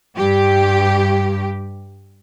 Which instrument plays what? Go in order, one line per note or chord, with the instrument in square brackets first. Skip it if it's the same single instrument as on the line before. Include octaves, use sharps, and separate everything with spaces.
[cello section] G2 G4